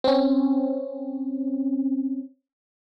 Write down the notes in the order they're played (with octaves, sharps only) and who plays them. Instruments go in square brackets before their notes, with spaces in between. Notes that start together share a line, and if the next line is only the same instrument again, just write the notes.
[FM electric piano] C4 C#4